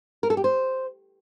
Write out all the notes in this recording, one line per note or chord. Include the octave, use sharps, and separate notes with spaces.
A#4
A4
G4
C5